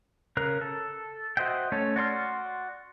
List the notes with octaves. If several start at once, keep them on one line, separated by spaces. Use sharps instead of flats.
C#3 A#4 F#6
A4
F#4 C5 D#5 E5 G5
A3 C#4 A4 C#5
F#4 D5 C6 F6